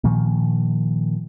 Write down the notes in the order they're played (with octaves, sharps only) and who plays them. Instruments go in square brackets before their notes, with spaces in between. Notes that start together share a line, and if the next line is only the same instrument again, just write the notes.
[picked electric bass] A#2 D#3 F3 A#3